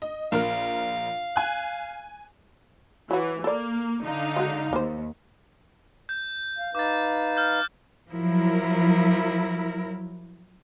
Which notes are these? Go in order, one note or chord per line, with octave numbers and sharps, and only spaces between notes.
D#5
A#1 A#4 F5 F6
G#5 F#6
E3 F#3 F#4
A#3 A4 D5
D3 D#4 F5
G#3 F#4
D#2 A#3 C5
G6
F5
D#4 B4 F5 D6 A6
F6 G6
F3 F#3 E4 A#4